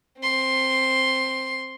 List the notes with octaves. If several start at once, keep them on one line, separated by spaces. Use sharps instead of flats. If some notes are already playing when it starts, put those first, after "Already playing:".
C4 C6